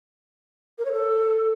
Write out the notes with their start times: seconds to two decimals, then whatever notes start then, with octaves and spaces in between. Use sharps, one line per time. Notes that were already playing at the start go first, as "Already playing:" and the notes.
0.78 A#4
0.85 C#5
0.92 A4